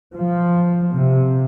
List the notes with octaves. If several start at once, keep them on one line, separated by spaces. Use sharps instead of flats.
F3
C3